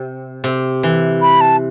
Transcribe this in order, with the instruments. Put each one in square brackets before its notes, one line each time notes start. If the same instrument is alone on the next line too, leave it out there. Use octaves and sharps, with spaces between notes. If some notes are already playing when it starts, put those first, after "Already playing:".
Already playing: [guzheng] C3
C3
E3
[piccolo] B5
A5